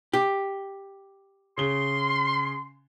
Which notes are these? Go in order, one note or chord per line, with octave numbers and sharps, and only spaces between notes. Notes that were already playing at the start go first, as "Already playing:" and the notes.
G4
C#3 C6 G7